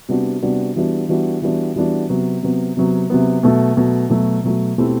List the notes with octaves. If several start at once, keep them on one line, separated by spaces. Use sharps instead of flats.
C3 G3 B3 D4 F#4
C3 G3 B3 D4 F#4
E3 G3 B3 D4 F#4
E3 G3 B3 D4 F#4
E3 G3 B3 D4 F#4
E3 G3 B3 D4 F#4
C3 F#3 B3
C3 F#3 B3
C3 F#3 B3
C3 F#3 B3
B2 F#3 A3
B2 F#3 A3
B2 F#3 A3
B2 F#3 A3
B2 A3 C4 E4 G4